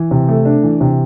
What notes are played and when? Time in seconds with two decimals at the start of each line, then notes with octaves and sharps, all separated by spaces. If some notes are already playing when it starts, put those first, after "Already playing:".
Already playing: E3
0.11 C3
0.28 A3
0.45 D4
0.63 E3
0.81 C3